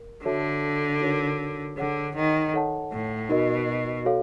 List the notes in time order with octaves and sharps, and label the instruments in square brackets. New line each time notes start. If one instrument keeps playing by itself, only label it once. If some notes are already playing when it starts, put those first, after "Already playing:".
Already playing: [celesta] A#4
[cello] D3 [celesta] F#4 A4 C#5 E5 A5
[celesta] D#4 F#4 A#4 C#5
[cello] D3 [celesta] G#4 C#5 F#5
[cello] D#3
[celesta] A4 C#5 F#5 A5
[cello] A2
[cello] B2 [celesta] D#4 F#4 A#4 D#5
[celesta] F#4 A4 C#5 F5